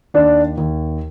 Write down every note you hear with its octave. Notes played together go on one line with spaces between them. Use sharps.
D#2 D4
D#2